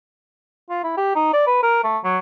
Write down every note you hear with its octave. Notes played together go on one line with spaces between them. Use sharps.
F4
E4
G4
D#4
D5
B4
A#4
A3
F#3